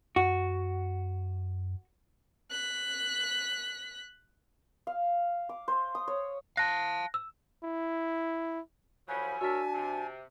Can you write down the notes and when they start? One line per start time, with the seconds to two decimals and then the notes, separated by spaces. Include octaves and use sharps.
0.16 F#2 F#4
2.51 F#6 B6
4.87 F5
5.49 D6
5.68 C5
5.95 D#6
6.08 C#5
6.57 F5 A5 F#6 A#6
7.14 E6
7.64 E4
9.08 C2 F3 F#3 C#5 G#5 B5
9.41 D4 F#4 A#4 C#5 E5 A5 B6
9.73 C3